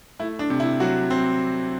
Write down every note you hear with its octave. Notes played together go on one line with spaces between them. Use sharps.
A3 E4
D4
C3
E4
F#3 F#4
C4